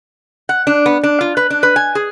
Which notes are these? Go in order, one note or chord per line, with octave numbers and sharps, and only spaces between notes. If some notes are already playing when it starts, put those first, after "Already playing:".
F#5
D4
B3
D4
F4
B4
D4
B4
G#5
G#4